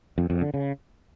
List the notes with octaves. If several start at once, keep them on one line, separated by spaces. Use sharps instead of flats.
F2
F2
D3
C#3